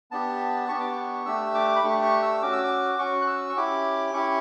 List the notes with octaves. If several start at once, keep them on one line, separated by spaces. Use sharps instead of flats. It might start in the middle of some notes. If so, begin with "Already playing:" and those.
B3 D4 G4 A5
B3 D4 G4 C#6
D6
C#6
A3 D4 G4 E6
D6
B5
A3 D4 G4 C#6
C#6
E6
C#4 F#4 D6
E6
D6
C#4 F#4 C#6
F#6
E6
C#6
C#4 E4 G4 D6
C#4 E4 G4 C#6